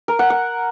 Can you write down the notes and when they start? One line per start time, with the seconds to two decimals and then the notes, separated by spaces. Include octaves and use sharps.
0.08 A#4
0.19 F#5
0.30 F#5